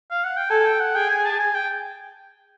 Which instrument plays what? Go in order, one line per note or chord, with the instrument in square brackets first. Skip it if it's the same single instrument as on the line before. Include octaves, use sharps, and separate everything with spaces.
[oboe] F5
F#5
G5
[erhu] A4 [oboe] G#5
[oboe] G5
F#5
[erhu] G#4 [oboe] G5
[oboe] G#5
A5
G#5
G5